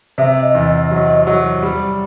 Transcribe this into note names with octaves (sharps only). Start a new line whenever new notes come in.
C3 E5
D#5
E2
D#5
F#3
F#3
G3